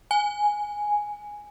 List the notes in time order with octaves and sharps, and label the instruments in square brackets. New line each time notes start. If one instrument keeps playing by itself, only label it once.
[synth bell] G#5